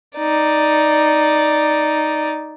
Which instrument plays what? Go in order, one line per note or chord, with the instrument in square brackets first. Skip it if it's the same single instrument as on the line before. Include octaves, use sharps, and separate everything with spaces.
[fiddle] D#4 D5